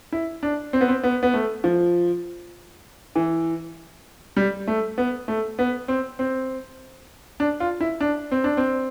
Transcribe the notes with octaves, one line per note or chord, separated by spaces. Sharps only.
E4
D4
C4
B3
C4
B3
B3
A3
F3
E3
G3
A3
B3
A3
B3
C4
C4
D4
F4
E4
D4
C4
D4
C4